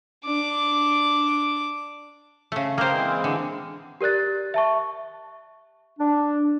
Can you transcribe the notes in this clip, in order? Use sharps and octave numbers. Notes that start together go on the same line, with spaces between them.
D4 D6
C#3 A3
A#3 C5 G5 A#5 D#6
E3 G#3 C4
D3
G4 A#4 D5 F#6 A6
E5 A5 C#6
D4